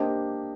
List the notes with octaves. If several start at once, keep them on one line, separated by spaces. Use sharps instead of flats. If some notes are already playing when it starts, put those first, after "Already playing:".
Already playing: A#3 D4 G4 C5 D#5